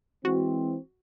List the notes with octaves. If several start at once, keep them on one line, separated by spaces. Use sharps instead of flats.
E3 G#3 C4 F#4